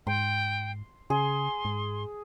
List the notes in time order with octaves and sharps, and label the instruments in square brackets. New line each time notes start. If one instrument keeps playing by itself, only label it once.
[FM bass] G#2 [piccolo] G5 [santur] C6
[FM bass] C#3 [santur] G#4 [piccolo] C6
[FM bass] G#2